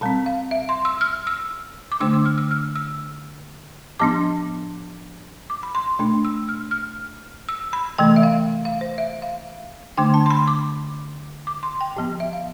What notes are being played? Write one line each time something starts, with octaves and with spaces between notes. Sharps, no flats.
B2 G3 C4 A5
F5
E5
C6
E6
F6
E6
D6
D3 A3 D4 E6
D6
F6
E6
F6
E6
A2 F3 B3 D4 D6
D6
B5
C6
B2 A3 D4 C6
E6
F6
F6
E6
B5
C3 E3 A3 G5
E5
F5
F5
C5
E5
F5
D3 A3 D4 G5
A5
C6
B5
D6
D6
C6
G5
A2 F3 B3
E5
F5